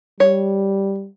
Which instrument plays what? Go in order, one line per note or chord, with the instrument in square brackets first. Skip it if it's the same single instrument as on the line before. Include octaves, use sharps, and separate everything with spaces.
[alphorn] G3 [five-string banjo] C#5